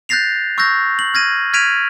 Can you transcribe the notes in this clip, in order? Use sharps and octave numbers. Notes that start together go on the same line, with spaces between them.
F#6 G6 A6 A#6 C7 F7
C#6 E6 F#6 G6 A#6
F#7
F6 G#6 A#6 D#7
F6 G#6 B6 D7 D#7 F7